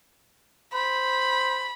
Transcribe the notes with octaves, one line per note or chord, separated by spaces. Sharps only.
C5 B5